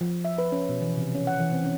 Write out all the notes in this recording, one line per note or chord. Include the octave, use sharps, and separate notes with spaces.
F3
E5
B4
C#4
B2
E3
C3
C#4
F#5
E3
C4
C#4